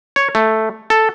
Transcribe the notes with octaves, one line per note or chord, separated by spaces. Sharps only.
C#5
A3
A4